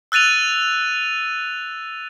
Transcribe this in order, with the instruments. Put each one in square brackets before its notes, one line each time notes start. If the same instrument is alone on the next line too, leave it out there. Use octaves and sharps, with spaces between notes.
[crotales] E6 F#6 A6 D#7 F7